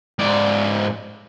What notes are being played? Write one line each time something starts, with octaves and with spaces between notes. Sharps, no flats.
G#2 D5